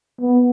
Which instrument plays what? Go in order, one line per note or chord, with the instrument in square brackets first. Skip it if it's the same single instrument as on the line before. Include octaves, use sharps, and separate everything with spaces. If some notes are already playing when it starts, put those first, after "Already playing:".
[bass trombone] B3